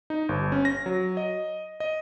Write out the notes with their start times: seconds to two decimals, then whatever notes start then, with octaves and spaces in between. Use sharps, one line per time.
0.10 D#4
0.29 G1
0.52 C#4
0.65 A#6
0.86 F#3
1.17 D#5
1.80 D#5